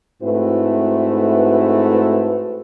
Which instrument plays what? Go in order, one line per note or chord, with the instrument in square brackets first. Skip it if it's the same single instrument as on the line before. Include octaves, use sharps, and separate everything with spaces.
[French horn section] G#2 A3 C4 E4 F#4 B4